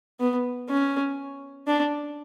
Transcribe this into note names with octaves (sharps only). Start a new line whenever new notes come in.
B3
C#4
D4